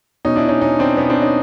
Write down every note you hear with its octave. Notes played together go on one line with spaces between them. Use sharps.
B2 C#4 D#4
D4 E4
C#4 D#4
B2 C#4 D#4
C4 D4
B2 B3 C#4
C4 D4
C#4 D#4